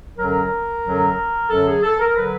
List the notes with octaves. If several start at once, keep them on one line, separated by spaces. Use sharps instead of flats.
F#2 D3 F#3 A#4
F#2 D3 F#3
F#2 D3 F#3 A4
G#4
A4
A#4
D3 F#3 B4